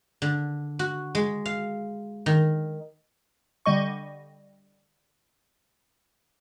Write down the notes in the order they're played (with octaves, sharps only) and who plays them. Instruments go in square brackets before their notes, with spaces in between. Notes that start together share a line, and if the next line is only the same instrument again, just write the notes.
[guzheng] D3
F#4
G#3
F5
D#3
[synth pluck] D3 G3 D#5 C#6